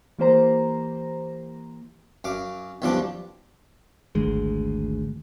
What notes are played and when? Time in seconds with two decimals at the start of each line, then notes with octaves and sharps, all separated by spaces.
0.19 E3 A#3 G4 C5 A#5
2.24 F#2 F5 D6
2.82 B1 F#2 F3 G3 D4 D6
4.15 G#1 D2 G#3